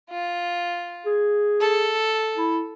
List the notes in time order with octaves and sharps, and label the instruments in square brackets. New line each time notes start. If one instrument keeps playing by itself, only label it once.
[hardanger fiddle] F4
[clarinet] G#4
[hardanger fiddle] A4
[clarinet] E4